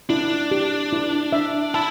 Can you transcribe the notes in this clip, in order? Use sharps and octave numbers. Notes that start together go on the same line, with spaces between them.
D4 E4
G4
E4
E5
E4 A5